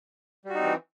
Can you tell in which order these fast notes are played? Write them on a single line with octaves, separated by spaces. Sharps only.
G3 F#4 D#4 C4 E3